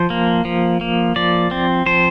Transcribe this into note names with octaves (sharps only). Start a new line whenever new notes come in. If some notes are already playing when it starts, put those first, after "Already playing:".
Already playing: F3 C5
A#3
F3
A#3
F3 D5
C4
F3 C5